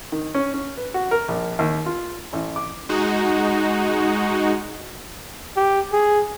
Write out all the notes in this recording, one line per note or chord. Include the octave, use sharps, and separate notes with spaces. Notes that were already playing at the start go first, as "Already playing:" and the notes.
D#3
C#4
C#4
B4
F#4
A#4
A#1
D#2
F4
A1
D6
G#3 D#4 F#4
G4
G#4